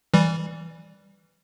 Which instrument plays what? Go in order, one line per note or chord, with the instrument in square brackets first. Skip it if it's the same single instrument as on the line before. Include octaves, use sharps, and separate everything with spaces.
[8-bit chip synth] E3 G3